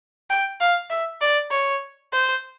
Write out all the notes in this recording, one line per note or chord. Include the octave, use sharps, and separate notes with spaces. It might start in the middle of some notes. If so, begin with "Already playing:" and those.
G5
F5
E5
D5
C#5
C5